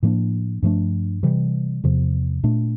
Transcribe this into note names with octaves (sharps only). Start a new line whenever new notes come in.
A2 F3 A#3 D4
G2 F3 A3 D4
C3 E3 G3
E2 C3 F3
A#2 A3 D4